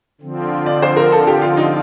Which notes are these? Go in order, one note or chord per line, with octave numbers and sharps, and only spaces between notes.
D3 F3 C4
D5
C5
A#4
A4
G4
F4
D#4